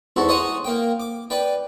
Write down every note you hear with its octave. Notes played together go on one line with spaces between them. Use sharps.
E2 G#2 F#4 A4
C5 C#5 D#5 F#5 G#5 A#5
A#3 G5
D6
B4 D5 G5